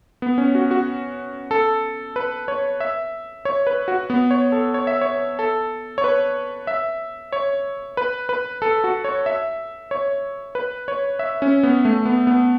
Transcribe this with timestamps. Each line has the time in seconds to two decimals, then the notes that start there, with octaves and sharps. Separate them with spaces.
0.22 B3
0.38 C#4
0.55 F#4
0.71 F#4
1.51 A4
2.16 B4
2.48 C#5
2.80 E5
3.45 C#5
3.67 B4
3.88 F#4
4.10 B3
4.31 C#5
4.52 A4
4.74 C#5
4.87 E5
5.01 C#5
5.39 A4
5.98 C#5
6.04 B4
6.67 E5
7.32 C#5
7.97 B4
8.29 B4
8.62 A4
8.84 F#4
9.04 C#5
9.26 E5
9.91 C#5
10.55 B4
10.88 C#5
11.19 E5
11.42 C#4
11.63 B3
11.85 A3
12.05 B3
12.27 B3